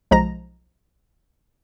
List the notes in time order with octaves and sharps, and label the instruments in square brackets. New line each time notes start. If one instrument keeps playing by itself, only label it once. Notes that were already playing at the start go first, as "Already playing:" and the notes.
[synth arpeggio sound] B1 F3 G#3 A#5 A#6